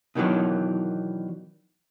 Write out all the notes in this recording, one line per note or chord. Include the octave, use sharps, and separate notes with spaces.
B2 D#3 E3 F#3 D4